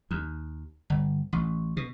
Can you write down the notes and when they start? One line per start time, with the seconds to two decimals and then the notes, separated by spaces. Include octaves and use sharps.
0.11 D#2
0.90 G1
1.33 A1
1.77 B2